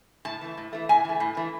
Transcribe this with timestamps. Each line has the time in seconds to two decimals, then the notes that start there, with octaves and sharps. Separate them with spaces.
0.25 A2 A5
0.41 E3 A3
0.58 A2
0.73 E3 A3
0.89 A2 G#5
1.05 E3 A3
1.20 A2
1.37 E3 A3